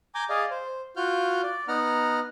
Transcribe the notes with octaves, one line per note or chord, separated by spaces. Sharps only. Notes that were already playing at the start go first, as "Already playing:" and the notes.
G#5 A#5 D6 G6
G#4 D5 D#5 F5
C5
F4 F#4 F6 G6
D5
B3 D#4 F#5 A#5 F6